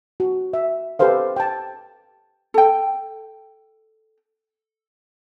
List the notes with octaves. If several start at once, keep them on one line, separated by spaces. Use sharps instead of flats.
F#4
E5
G4 A4 B4 C5 F5
G5 A5
A4 G5